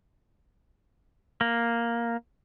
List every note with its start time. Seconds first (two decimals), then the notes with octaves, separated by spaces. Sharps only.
1.41 A#3